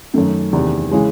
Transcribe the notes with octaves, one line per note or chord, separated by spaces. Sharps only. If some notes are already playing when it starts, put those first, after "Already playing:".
F#2 D#3 A3
E2 C3 D#3
C#3 E3 G#3